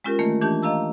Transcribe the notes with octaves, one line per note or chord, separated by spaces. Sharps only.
G#3 C#4 F4 G4 A#4
D#3 E3 A3 A#3
E3 D4 G4 A5 G6
D#5 F5 A#5 E6